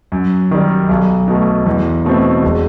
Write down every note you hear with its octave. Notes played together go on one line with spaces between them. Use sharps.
F#2
D#3 G3
B1
B2 A3
E2
B2 A3 C4
E1